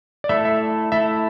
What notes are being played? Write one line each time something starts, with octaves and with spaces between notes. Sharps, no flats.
D5
A3 E4 A4 E5
E5
A3 E4 A4 E5